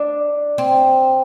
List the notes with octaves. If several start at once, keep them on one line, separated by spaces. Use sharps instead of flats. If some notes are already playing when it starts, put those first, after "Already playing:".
Already playing: D4
C4